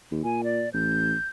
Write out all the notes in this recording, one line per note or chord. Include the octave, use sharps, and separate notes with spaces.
D#2
A#2 G#5
D5
A1 G6